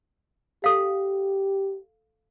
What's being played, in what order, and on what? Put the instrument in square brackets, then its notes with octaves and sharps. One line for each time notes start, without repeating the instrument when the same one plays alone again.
[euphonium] G4 [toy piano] A4 F5